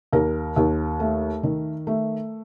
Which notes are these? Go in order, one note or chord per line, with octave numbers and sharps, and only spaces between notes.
D#2 A#4
D#2
A3
D#3
A3